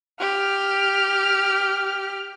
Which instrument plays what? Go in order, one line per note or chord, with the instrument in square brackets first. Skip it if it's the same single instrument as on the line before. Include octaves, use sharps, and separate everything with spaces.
[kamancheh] G4 F6